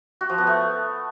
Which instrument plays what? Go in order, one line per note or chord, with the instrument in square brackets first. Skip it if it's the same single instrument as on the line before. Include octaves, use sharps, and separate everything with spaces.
[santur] F#4
F3
B3
A3